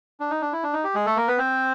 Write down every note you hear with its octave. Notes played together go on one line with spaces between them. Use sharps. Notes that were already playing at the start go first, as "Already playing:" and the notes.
D4
D#4
D4
E4
D4
D#4
G4
G#3 G#4
A3 A4
A#3 A#4
B3 B4
C4 C5